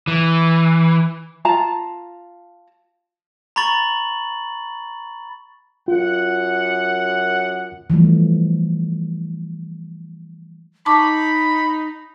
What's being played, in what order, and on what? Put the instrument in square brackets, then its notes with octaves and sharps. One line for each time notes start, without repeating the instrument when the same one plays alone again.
[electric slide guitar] E3
[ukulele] F4 A5 A#5
[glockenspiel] A#5 B5 C#6 A6 F#7
[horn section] F#2 F#5 [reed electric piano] F4
[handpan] E3 F3 G3 A3
[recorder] D#4 [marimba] A5 C#6 D6 [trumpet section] B5